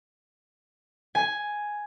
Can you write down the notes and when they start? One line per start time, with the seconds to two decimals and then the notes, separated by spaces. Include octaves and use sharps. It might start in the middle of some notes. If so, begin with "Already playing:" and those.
1.15 G#5